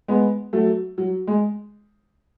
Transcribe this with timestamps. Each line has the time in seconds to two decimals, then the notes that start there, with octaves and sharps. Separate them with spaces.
0.08 G#3 B3
0.53 F#3 A3
0.98 F#3
1.27 G#3